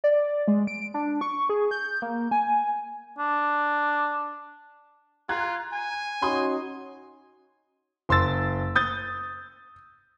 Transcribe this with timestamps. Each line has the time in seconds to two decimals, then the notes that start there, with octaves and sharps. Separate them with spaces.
0.04 D5
0.48 G#3
0.67 D7
0.94 D4
1.21 C#6
1.49 G#4
1.71 G6
2.02 A#3
2.31 G#5
3.19 D4
5.29 F4 A#5 F#6 G#6
5.73 G#5
6.22 C#4 D#4 F#4 C6 D#6
8.09 F#1 C6 E6 A6
8.76 D#6 G6 A6